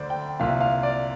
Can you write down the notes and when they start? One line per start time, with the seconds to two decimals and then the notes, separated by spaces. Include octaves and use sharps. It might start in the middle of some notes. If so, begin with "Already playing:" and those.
Already playing: D2 D3 C5 D5
0.10 G5
0.39 C2 A#2 F5
0.60 F5
0.83 D5